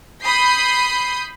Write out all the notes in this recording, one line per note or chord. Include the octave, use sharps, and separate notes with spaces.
B5 D#6 G6 C7